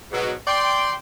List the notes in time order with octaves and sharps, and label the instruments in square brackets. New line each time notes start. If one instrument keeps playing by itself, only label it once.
[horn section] G#2 B2 F#3
D5 G5 C6